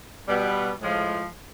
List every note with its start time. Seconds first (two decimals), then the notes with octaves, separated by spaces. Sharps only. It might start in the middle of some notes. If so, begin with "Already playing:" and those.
0.27 B2 G3 B3
0.81 A2 F3 G#3